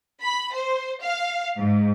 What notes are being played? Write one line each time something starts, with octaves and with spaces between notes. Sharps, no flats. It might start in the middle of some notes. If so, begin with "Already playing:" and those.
B5
C5
F5
G#2